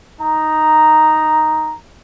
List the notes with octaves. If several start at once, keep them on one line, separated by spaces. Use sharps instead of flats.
D#4 A#5